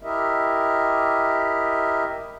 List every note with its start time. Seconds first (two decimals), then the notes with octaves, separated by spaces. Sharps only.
0.03 E4 G4 A#4 D#5 E5